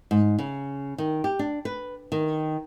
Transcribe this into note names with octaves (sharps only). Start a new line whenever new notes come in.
G#2
C#3
D#3
G4
D4
B4
D#3